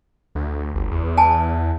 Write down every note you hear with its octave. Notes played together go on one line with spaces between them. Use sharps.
D2
G1
E2
G#5 A5